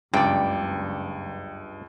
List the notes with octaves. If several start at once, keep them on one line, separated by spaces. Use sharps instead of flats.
F#1 C#2 G2 D5 G5